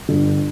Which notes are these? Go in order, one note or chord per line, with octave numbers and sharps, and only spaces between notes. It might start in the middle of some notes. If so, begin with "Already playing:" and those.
G1